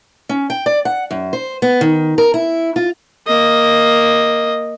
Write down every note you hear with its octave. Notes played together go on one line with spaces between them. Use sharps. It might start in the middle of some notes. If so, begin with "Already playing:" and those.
C#4
G5
D5
F#5
F#2
C5
B3
D#3
A#4
E4
F4
A#3 D#5